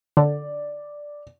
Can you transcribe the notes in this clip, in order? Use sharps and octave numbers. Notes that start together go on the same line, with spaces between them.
D3 D5